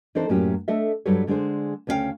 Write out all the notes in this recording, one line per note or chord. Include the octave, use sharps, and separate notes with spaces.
E3 C4 D4 D#4 A4 C5
F#2 A2 F#3 A#3 C#4 G4
A3 D4 A4 D#5 E5
G2 F#3 G3 A4 B4 C#5
D3 G#3 D4 G#4 C5
D2 C#3 C#4 F4 F5 G5